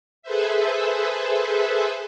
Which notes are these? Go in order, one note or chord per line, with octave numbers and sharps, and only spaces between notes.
G#4 A4 B4 C5 E5